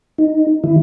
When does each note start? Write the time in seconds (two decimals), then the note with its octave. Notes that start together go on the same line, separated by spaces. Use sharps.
0.18 D#4
0.64 D#3 E4